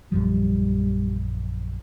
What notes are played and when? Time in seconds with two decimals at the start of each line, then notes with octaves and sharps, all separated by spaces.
0.12 A#1 F#2 F3 G3